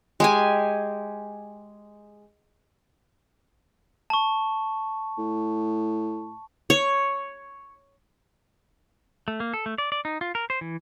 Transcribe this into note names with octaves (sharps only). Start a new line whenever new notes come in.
G#3 G4 G#5
A5 C#6
A2
C#5
A3
A#3
A4
A3
D5
D5
D#4
F4
A#4
C5
E3